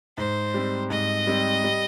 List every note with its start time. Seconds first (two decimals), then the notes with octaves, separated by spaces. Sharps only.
0.18 G#2 C5
0.54 G3 C4
0.90 G#2 D#5
1.27 G3 C4
1.64 G3